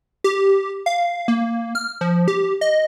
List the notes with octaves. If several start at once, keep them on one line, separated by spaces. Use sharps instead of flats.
G4
F5
A#3
F6
F3
G4
D#5